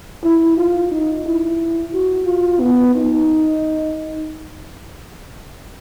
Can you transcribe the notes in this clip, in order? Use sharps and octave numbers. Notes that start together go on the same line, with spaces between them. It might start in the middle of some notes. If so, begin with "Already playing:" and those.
E4
F4
D#4
E4
F#4
F4
B3
D#4